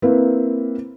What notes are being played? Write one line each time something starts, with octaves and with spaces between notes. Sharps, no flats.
A#3 C4 E4 B4